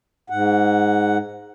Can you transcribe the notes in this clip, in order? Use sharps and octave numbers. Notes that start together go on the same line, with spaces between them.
G#2 F#5